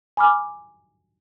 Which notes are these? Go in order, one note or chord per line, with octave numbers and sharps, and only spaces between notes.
G#5 B5 D6 F6